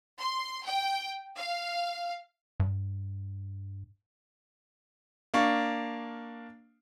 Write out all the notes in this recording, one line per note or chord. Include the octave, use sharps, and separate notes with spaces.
C6
G5
F5
G2
A#3 D4 F5 C#6